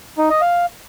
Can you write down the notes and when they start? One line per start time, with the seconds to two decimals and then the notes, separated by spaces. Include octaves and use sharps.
0.18 D#4
0.30 D#5
0.41 F5